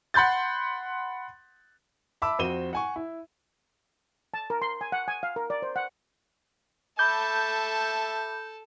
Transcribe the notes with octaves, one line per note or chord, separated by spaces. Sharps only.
F#5 B5 C6 G6 A6
E5 A5 B5 D6 E6
F2 C4 F#4 D#7 E7 G7
F#5 G#5 C#6
E4
A5
A#4
C6
G#5
F#5
G#5
F5
A#4
D5
C5
F#5
A4 E5 A5 B5 D6 G6